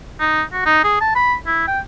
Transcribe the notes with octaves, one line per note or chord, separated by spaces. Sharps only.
D#4
F#4
D#4
G#4
A5
B5
E4
G5